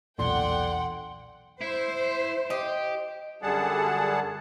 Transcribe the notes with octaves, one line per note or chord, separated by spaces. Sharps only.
B1 E2 A#2 D3 F#5 G5 C6
E4 C5
G4 D#5
F#2 D3 G3 G#4 F#5 A5